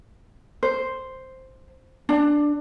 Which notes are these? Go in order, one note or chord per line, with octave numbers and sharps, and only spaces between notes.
C5
D4